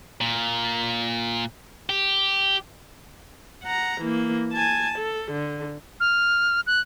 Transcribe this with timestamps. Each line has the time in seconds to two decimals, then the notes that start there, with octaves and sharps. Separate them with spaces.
0.21 A#2
1.90 G4
3.63 F#5 A#5
4.01 E3 A#3
4.53 G#5 A5
4.99 A4
5.32 D3
6.00 F6
6.67 F#6